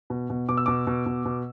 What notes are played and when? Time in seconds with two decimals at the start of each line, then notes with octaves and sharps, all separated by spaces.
0.10 B2
0.30 B2
0.48 B2 D6
0.57 E6
0.66 B2 D6
0.87 B2
1.06 B2
1.25 B2